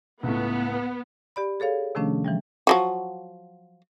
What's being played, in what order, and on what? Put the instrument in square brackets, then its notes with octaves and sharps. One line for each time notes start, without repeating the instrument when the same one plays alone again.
[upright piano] C#2 A2 [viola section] B3
[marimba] G4 D5 B5
G#4 A4 C#5 F5
C3 D#3 F3 A3 C#4 D4
E3 F3 G3
[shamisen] F3 F#3 F#4